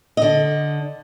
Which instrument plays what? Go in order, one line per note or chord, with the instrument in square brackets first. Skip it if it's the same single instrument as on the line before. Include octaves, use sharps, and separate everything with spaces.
[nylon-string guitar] D3 D#5